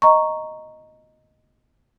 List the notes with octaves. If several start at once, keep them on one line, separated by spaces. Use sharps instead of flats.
D#5 A#5 C#6